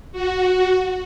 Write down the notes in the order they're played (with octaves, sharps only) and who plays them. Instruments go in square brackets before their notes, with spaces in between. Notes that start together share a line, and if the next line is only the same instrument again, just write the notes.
[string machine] F#4